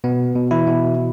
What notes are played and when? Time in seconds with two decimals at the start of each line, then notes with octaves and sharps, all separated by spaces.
0.04 B2 B3
0.35 B2
0.51 E3 E4
0.67 B2